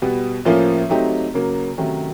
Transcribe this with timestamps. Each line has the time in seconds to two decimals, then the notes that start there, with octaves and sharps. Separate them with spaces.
0.02 B2 G3 B3
0.45 A2 F3 A#3 C#4 F4
0.89 F#3 A3 C4 D#4 G4
1.34 C#3 F#3 A#3
1.77 C3 D#3 F#3 A3 C#4